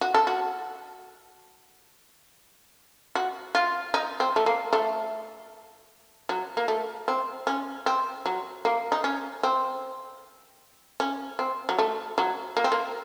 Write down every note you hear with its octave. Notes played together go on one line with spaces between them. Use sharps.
F#4
A4
F#4
F#4
F4
D#4
C4
A3
A#3
A3
F#3
A#3
A3
C4
C#4
C4
F#3
A#3
D#4
C#4
C4
C#4
C4
F#3
A3
F#3
A#3
C4
A#3